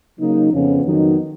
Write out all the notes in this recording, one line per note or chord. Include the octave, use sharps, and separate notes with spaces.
C#3 F#3 A#3 D#4
F2 C#3 F3 B3 C#4
F2 D#3 F#3 B3 D#4